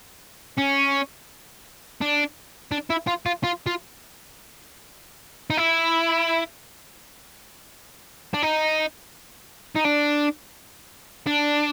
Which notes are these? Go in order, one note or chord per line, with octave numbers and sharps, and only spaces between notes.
C#4
D4
D4
E4
F4
F4
F4
F4
D#4
E4
D4
D#4
D#4
D4
D4